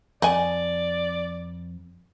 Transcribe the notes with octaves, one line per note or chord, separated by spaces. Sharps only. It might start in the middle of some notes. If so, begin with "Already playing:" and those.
F2 D5 D#5 F#5 G#5